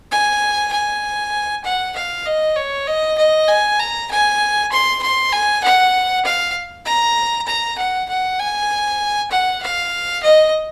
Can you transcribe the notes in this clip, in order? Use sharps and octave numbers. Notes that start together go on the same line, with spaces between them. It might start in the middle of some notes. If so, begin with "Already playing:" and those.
G#5
G#5
F#5
F5
D#5
C#5
D#5
D#5
G#5
A#5
G#5
C6
C6
G#5
F#5
F5
A#5
A#5
F#5
F#5
G#5
F#5
F5
D#5